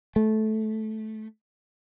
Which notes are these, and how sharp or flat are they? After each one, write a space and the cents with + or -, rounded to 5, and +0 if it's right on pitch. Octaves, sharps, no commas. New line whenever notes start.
A3 -15